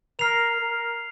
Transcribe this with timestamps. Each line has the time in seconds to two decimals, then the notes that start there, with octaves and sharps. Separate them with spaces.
0.19 A#4 F6 C7 F7
0.61 A#4